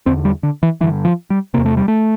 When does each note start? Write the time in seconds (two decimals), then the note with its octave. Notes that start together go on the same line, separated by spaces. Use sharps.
0.06 E2 D3 C4
0.25 G3
0.43 D3
0.63 E3
0.81 D3 E3
0.84 G2
1.05 F3
1.30 G3
1.54 E2 C3 A#3
1.65 A3
1.77 G3
1.88 A3